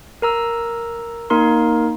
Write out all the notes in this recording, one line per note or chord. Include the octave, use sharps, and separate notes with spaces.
A#4 A#5 E6
A#3 D#4 A#4 C6